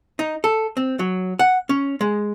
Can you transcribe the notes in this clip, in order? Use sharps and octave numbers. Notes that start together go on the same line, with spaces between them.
D#4
A4
C4
F#3
F#5
C#4
G#3